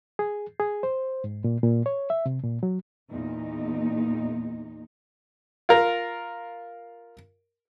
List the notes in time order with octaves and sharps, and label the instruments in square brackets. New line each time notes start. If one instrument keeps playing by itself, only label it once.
[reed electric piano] G#4
G#4
C5
G#2
A#2
A#2
C#5
E5
C3
A#2
F#3
[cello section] E2 A#2 D#4
[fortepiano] F4 A#4